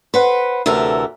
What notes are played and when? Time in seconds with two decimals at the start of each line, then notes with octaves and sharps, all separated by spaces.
0.14 B4 C5 F#5
0.66 D2 C3 E3 A4 A#4